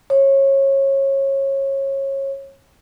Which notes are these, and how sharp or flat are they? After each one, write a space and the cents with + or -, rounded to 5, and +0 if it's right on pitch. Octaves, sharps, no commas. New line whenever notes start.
C#5 -25